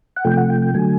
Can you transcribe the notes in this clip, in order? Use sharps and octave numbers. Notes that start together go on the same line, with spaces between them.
F#5
C3 F3 A3 G5
F#5
G5
G5
D3 F#3 A3 G#5